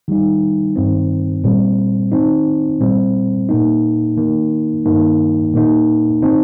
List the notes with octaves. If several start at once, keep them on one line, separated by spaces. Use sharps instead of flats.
D#3 G3 D#4
G2 D#3 C4
A#2 G3 C4
D#3 C4 D#4
A#2 G3 C4
A#2 A#3 D#4
D#3 A#3 D#4
G2 D#3 A#3 D#4
A#2 A#3 D#4
D#3 C4 D#4